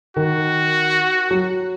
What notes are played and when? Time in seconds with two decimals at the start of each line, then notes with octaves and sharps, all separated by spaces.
0.16 D#3 F#4
1.31 F#3